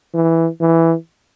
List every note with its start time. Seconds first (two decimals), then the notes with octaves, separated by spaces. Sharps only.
0.14 E3
0.61 E3